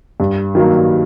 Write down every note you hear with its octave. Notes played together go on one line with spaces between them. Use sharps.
G2
D#3 F#3 A#3